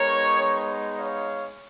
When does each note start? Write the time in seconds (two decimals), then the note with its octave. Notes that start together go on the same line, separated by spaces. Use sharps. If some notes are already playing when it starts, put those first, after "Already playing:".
Already playing: G#3 B3 D#4 A#4 C#5
0.98 C#5 F5